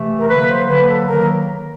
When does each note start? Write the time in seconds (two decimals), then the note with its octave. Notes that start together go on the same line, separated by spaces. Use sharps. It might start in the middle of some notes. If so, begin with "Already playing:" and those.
Already playing: C3 E3 A3
0.19 A#4
0.29 D3 F#3 A#3 B4
0.48 C5
0.68 D3 F#3 A#3 B4
0.89 A4
1.07 D#3 F#3 A#3 A#4